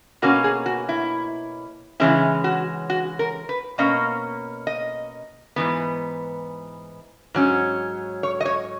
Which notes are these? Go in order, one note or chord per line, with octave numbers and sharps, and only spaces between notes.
B2 A#3 C#4 F#4
G#4
F#4
E4
C#3 E3 G#3 C#4 E4
F#4
F#4
A#4
B4
B2 A#3 C#4 D#5
D#5
G#2 E3 B3
G#2 F#3 C#4
C#5
D#5
C#5